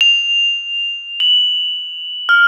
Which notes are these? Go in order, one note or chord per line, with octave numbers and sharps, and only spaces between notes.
F7
F#7
F6